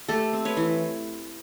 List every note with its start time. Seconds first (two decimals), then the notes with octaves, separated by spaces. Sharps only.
0.09 A3 G4 A4
0.33 C4
0.45 B4 C#5
0.57 E3